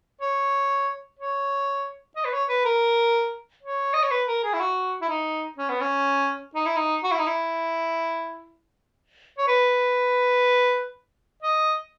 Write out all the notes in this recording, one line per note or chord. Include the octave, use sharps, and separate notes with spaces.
C#5
C#5
D#5
B4
C#5
B4
A#4
C#5
D#5
C#5
B4
A#4
G#4
E4
F#4
E4
D#4
C#4
B3
C#4
D#4
E4
D#4
F#4
E4
D#4
E4
C#5
B4
D#5